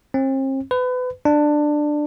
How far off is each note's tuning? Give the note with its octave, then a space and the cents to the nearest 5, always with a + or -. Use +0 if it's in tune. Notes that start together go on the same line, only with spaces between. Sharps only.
C4 +40
B4 +30
D4 +15